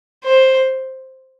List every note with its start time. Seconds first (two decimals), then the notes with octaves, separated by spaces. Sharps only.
0.24 C5